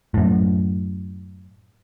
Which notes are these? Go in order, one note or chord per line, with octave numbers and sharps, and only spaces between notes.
F#2 A2